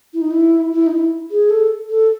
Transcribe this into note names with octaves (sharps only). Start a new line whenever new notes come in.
E4
D#4
E4
E4
D#4
E4
G#4
A4
A4